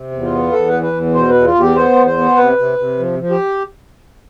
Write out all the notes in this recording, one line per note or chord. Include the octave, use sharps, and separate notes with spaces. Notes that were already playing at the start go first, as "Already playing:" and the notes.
Already playing: C3
E2
F4
B3
E2 A4
B4
E3
B4
E2
B2 C5
B4
E2
F4
E2
G4
B3 C5
E2
C5
B3
C3 B4
C3
C3
F3
F3
G4